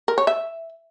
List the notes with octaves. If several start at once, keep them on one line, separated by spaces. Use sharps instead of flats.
A#4
C#5
E5